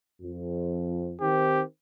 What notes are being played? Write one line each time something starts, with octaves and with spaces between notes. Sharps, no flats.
F2
D#3 C4 G4